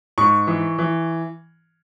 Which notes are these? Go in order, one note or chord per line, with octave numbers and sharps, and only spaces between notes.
G#2 C#6
E3
E3